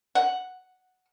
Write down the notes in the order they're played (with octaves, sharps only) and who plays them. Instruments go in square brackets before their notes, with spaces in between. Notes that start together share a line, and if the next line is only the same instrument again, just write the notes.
[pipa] F#5